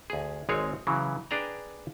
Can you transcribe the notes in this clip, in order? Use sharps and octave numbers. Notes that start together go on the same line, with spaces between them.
D2 G#4
G#1 G#3 C4 G#4 C#5
C#3 E3 F#3
D4 G#4 B4 D5 G5 A#5